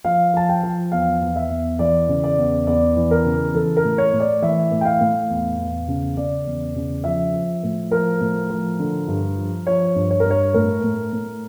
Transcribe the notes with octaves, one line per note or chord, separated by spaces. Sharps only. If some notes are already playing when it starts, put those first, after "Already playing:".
F3 F5
F3 A5
G5
F3
E2 F5
E2
E5
E2
E3 D5
C#3
D5
E2
E2 D5
E3
A#4
C#3
E3 A4
A#4
A2
C#5
A2
D5
E3 E5
A2
G5
F5
A2
E2
E2
C#3
C#3 D5
E2
C#3
F3 E5
F3
A2
F3 A#4
A2
F3
D3
G2
F3
F3 C#5
G2
C#5
A#4
G2
C#5
A2 A#4
A2
A2